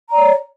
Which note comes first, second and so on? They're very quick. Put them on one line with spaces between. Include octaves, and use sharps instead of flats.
A#5 D5 C#5